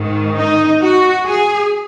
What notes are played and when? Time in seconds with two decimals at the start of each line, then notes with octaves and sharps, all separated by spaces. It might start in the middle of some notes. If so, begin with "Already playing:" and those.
Already playing: G#2 D#3
0.35 D#4
0.80 F#4
1.25 G#4